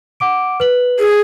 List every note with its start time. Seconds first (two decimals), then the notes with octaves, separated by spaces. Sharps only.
0.20 F#5 D6 D7
0.60 B4 F#7
0.99 G#4